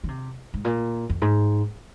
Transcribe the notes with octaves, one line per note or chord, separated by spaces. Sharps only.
D#3
C3
G#2
A#2
F2
G#2